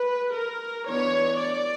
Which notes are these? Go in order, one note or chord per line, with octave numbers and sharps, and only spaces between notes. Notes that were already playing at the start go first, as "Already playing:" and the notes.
Already playing: B4
A#4
E3 B3 D4 C#5
D5